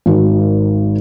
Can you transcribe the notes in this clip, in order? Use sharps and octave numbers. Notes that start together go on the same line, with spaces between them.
G#1 F#4